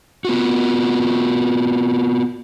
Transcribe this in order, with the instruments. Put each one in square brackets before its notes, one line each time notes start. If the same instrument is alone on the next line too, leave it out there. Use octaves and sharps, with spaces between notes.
[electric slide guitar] B3 F4 F#4